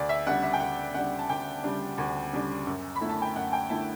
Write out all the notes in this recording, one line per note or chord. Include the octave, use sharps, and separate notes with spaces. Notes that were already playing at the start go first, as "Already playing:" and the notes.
Already playing: D2 D5
E5
C#3 G3 D4 F#5
E5
G5
D2 F#5
C#3 G3 D4 F#5
A5
D2 G5
C#3 G3 D4
D2
C#3 G3 D4
F#2
B5
D3 A3 E4
A5
G5
F#2 F#5
G5
D3 A3 E4 A5